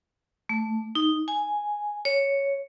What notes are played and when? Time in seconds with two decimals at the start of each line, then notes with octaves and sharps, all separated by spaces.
0.49 A3
0.95 D#4
1.28 G#5
2.05 C#5